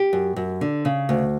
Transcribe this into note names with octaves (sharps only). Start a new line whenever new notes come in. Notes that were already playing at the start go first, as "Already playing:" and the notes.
Already playing: G4
F#2
F#2
D3
C#3
D2